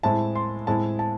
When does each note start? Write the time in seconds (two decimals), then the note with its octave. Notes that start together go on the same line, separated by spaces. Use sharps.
0.03 A2 G#3 C4 E4 A5
0.36 C6
0.67 A2 G#3 C4 E4 A5
0.99 A5